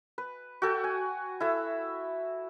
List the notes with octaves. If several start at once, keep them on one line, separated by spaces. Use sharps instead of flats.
B4
F#4 A4 G5
G#5
E4 A4 E5